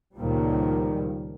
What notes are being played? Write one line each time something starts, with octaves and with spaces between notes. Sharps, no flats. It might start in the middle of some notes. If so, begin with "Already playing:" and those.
C#2 A#2 D#3 F3 G3